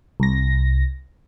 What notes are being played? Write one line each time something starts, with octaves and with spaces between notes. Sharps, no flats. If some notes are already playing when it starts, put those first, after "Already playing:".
C2 A#6